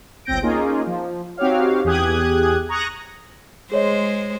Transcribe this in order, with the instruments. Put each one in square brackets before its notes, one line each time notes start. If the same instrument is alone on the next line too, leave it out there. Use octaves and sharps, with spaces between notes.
[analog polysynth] G1 C#2 C4 G6 A#6 D7
A#3 C#4 D#4 F4 G#4
F3
C4 D#4 F#4 G4 C#5 F5
E2 G4 G#4 D#6 F#6 G#6
A#5 C#6 D#6 F#6 G#6 A#6
[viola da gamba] G#3 C5 [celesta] G#4 C#5 D#5